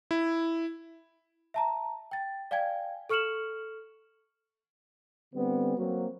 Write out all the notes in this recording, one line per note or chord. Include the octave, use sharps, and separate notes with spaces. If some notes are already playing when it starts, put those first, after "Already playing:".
E4
E5 A5 A#5
G5 A6
D5 F5 G5 G#5 G#6
A4 C#6 F6 C#7 E7 F#7
D3 G3 B3 C4
F#3 A#3 C4 F#4